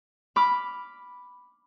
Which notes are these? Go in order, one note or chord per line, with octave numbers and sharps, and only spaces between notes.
B5 D6 F6